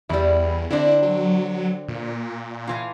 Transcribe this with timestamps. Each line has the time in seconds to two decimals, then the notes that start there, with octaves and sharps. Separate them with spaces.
0.09 E2 G3 E4
0.70 D3 C4 D4 E4
1.02 F#3
1.88 A#2
2.67 A2 E3 F4